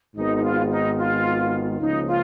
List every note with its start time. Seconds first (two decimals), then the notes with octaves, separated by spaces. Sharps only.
0.15 G#1 G#2 D#3 G#3 B3 D#4
0.36 D#4
0.43 F4
0.70 D#4
0.98 F4
1.80 C#2 C#3 F3 A#3 C#4 D#4
2.07 F4